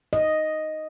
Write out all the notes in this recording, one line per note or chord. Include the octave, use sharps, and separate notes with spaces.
D#5